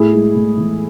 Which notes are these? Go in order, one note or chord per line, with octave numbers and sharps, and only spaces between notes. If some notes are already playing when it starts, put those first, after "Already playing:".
Already playing: A2 E4 G#4
G#3
A2
E3